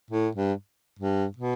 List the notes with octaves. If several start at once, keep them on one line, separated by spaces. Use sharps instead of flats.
A2
G2
G2
B2